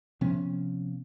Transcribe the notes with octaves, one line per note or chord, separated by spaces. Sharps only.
C3 F3 B3 C#4